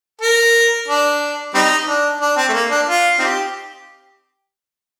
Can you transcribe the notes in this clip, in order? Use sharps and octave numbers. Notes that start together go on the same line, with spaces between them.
A#4
D4
G3 C4 D#4
D4
D4
C4
A3
A#3
D4
F4
C4 D#4 G4